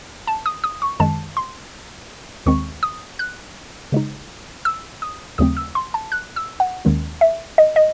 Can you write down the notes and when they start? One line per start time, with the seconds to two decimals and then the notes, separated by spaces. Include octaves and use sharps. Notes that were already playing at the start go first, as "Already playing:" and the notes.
0.27 A5
0.46 D#6
0.64 D#6
0.82 C#6
1.00 F#2 D#3 G#3 A5
1.37 C6
2.46 D#2 D#3 G#3 C4 C#6
2.83 D#6
3.19 F#6
3.92 C#3 G#3 D#4
4.65 E6
5.02 D#6
5.38 D#2 C#3 F#3 A3 C4 D#6
5.57 E6
5.75 C6
5.94 A5
6.12 F#6
6.36 E6
6.60 F#5
6.85 D#2 D#3 G#3 C#4
7.21 E5
7.58 D#5
7.76 D#5